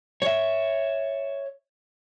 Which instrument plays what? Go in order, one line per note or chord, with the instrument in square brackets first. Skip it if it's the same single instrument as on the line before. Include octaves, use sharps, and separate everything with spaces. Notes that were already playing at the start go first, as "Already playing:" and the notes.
[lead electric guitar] C#5 E5